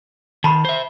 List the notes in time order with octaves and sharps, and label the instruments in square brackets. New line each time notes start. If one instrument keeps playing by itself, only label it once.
[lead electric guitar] D#3 [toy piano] A5 B5 C6
[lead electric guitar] C5 E5